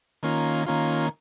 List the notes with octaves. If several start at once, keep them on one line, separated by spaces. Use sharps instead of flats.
D#3 A#3 C#4 F4
D#3 A#3 C#4 F4